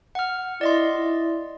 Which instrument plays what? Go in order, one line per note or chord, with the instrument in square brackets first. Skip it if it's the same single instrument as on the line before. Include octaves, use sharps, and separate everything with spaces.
[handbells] F#5 F6
[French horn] E4 [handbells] D5 D#5 C6
[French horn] E4